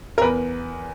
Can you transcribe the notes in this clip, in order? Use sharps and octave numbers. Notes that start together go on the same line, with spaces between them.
A#4
E2 B4